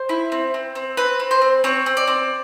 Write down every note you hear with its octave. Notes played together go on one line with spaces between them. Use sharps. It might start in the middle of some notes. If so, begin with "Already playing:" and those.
Already playing: C5
E4
C4
C4
C4
C4 B4
C4
C5
C4
C4 C#5
C4
D5
C4